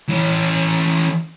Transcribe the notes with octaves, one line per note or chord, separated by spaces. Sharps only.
E3 C#4